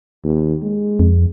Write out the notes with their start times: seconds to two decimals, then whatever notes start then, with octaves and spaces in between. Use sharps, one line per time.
0.24 D#2
0.62 G#3
0.99 F2